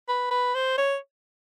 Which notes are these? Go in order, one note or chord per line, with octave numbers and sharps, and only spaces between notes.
B4
B4
C5
C#5